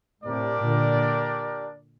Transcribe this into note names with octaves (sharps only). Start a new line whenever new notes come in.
A2 C3 D4 G4 A#4 D5
A#2 D3